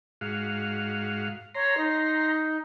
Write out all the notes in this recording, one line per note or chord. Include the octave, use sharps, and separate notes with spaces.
G#2 F#4 F5
C#5 A#5 C6
D#4